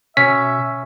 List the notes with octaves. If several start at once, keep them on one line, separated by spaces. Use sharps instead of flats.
B2 C#4 E5 B6